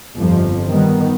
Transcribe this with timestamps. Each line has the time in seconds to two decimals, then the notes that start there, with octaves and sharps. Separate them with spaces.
0.17 G1 F2 F3
0.70 D#3 G3 B3